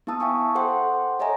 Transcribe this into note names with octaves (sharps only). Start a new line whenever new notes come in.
B3 E4 F5 A5 D#6 E6
E5 F5 G5 G#5 C#6
A4 C5 F#5 G5 C6 D6
A4 C#5 D#5 E5 G#5 A#5